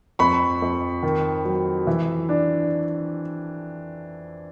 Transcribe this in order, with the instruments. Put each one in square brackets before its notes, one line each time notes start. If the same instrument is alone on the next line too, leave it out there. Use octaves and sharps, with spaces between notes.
[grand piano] F2 B5 C#6
F2
D#3
F#3
E3
D4